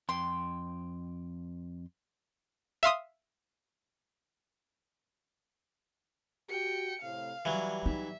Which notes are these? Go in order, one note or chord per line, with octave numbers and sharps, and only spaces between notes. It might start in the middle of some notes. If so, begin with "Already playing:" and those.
F2 G5 C6
E5 F5 C6 D#6
F#4 G4 G5 C#7
A2 C3 F5
E3 F#3 G3
D#4 E5